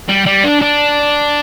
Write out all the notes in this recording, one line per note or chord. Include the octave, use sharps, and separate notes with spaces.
G3
G3
D4
D4